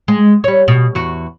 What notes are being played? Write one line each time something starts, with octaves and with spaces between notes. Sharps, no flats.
G#3
G3 C#5
B2
E2 F#4